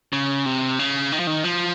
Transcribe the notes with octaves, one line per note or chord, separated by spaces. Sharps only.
C#3
C3
C#3
D#3
F3
D#3
F3